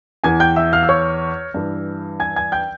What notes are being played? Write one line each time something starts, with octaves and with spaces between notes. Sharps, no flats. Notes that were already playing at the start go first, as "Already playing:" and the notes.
E2 E3 G#5 G#6
G5 G6
E5 E6
F5 F6
E6
C#5 C#6
G2 E3
G#5 G#6
G#5 G#6
G5 G6